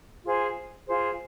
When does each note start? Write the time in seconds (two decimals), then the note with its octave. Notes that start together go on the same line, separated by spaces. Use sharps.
0.25 F4 G#4 C5
0.88 F4 G#4 C5